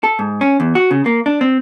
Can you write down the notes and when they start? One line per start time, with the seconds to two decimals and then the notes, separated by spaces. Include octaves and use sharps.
0.03 A4
0.19 G#2
0.41 C#4
0.60 E2
0.75 F#4
0.91 C#3
1.06 A#3
1.26 D4
1.41 C4